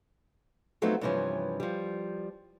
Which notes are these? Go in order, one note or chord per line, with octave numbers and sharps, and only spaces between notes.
F3 F#3 A3 B3 C4 D#4
G2 C3 E3 F3 C#4
F3 G3